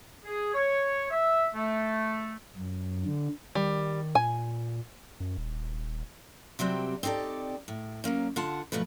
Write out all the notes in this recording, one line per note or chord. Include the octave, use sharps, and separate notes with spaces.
G#4
C#5
E5
A3
F#2
D3
D#3 G3
A#2 G#5
F#2
D#1
C3 F#3 G3 C4
C4 D#4 G4 A4 D5
A2
F#3 G#3 A#3 C#4
D3 F4 F#5 A5
B2 F3 F#3 A3 B4